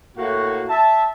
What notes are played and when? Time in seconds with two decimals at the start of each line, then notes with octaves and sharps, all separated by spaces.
0.16 A2 A#3 F#4
0.69 E5 A5